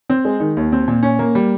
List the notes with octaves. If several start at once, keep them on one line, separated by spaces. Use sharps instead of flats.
C4
G#3
D#3
D#2
C4
A#2
C#4
A#3
G3